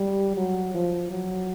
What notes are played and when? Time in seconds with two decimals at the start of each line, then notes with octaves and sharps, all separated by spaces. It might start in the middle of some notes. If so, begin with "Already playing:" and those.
Already playing: G3
0.36 F#3
0.74 F3
1.11 F#3